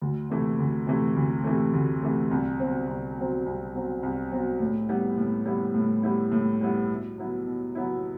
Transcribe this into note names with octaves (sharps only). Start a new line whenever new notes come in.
D2
C3 E3 A3
D2
C3 E3 A3
D2
C3 E3 A3
D2
C3 E3 A3
C2
B2 F#3 C4
C2
B2 F#3 C4
C2
B2 F#3 C4
C2
B2 F#3 C4
A2
G3 B3 E4
A2
G3 B3 E4
A2
G3 B3 E4
A2
G3 B3 E4
B2
F#3 B3 E4
B2
F#3 B3 E4